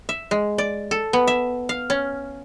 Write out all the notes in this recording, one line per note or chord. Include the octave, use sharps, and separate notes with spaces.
E5
G#3
D5
A4
B3
E5
F5
C#4